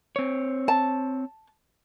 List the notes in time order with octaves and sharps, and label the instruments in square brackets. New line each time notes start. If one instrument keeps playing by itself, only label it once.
[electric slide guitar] C4 C#5
[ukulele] A5